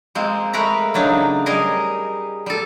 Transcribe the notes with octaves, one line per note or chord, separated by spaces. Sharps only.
G#3 A#3 C4
G#3 A3 A#4 B4 A#5
C#3 F#3 D4 D#4
G3 G#4 A#4 D#5
G3 A4